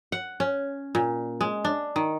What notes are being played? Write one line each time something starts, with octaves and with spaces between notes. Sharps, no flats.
F#5
C#4
A#2
G#3
D4
D#3